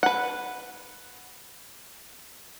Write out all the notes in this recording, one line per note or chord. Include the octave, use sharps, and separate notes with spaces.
B4 F#5